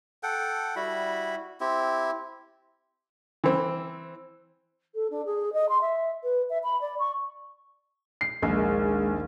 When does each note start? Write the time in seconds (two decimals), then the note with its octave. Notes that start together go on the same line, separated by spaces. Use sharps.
0.23 A4 F#5 G5
0.76 G3 E4 F#4 B5
1.60 C4 E4 G4
3.44 E3 C4
4.95 A4
5.10 D4
5.25 G#4
5.53 D#5
5.69 C6
5.81 E5
6.23 B4
6.50 E5
6.63 B5
6.81 D5
6.99 C#6
8.21 C7
8.42 A#1 D#2 G#3